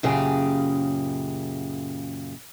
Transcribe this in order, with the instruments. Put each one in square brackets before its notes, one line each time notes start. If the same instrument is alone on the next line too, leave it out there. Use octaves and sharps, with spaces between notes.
[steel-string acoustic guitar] F#2 A#2 C#3 G4 G#4